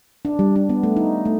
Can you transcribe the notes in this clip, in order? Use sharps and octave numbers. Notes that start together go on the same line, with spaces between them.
D4
G3
D4
B3
A3
D#4
A3